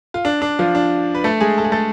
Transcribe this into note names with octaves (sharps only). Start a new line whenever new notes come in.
F4
D4
D4
F3 F4
D4
B4
A3 A4
G#3 G#4
A4
G#4
A3 A4